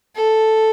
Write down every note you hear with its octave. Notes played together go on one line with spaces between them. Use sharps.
A4